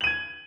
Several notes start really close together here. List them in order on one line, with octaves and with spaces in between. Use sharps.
F#7 D#7 G#6